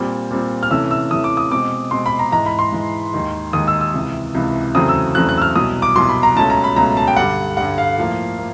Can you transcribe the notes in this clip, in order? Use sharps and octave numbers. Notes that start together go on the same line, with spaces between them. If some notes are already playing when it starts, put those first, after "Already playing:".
Already playing: A#2 G3 C4
A#2 G3 C4
F6
C3 E3 A3 C#4 E6
E6
C3 E3 A3 C#4 D#6
D6
D#6
B2 G#3 C4 D6
B2 G#3 C4 C6
B5
A#5
G#2 E3 G#3 A#5
B5
C6
G#2 E3 G#3
D#2 D#3 G#3
D#2 D#3 G#3 D#6
E6
E6
C#2 C3 E3
C#2 C3 E3
E2 C#3 F#3 A3 C4 D#6
E6
E2 C#3 F#3 A3 C4 F#6
F#6
E6
F6
C2 B2 F#3 D#6
D6
C2 B2 F#3 C6
B5
A#5
C#2 B2 F#3 A3 C#4 A5
A#5
B5
C#2 B2 F#3 A3 C#4 A#5
A5
G5
G2 D3 G3 F#5
G2 D3 G3 F#5
F5
A2 F3 A#3
A#3